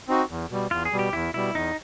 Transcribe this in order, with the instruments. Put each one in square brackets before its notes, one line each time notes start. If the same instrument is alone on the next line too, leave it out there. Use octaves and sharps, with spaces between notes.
[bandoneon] C4 D#4 F#4
E2
B2 G3
[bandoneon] E2 [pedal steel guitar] F4
[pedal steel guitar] G#4
[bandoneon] B2 G3
[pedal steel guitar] G4
[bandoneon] E2 [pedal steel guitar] E4
[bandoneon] B2 G3 [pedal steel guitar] E4
[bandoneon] E2 [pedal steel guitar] D#4